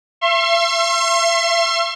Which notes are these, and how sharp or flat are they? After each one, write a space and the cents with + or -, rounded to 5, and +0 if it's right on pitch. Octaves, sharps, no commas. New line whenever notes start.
E5 +40 C6 +40